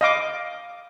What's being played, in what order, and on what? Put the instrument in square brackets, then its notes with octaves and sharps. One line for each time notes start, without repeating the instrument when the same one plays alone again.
[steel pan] D#5 F5 D6